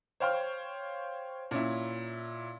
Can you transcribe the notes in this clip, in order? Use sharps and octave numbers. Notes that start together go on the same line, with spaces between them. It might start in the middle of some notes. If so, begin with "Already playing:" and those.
C5 C#5 F5 G5 C6 F6
A#2 C#4 E4